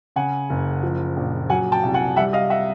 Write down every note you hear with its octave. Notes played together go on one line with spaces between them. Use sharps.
C#3 F#5 G#5
F#1
F3
A#1
F#3 F#5 G#5
G5 A5
C2
F#5 G#5
G3 E5 F#5
D#5 F5
E5 F#5